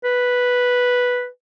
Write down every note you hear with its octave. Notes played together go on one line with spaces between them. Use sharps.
B4